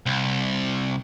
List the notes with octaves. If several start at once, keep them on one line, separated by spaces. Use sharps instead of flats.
C2